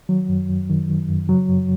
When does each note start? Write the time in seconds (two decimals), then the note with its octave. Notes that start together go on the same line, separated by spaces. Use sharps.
0.09 D#3 F#3
0.29 F#2
0.50 F#2
0.70 D#3
0.89 D#3
1.09 F#2
1.29 C#3 F#3
1.49 F#2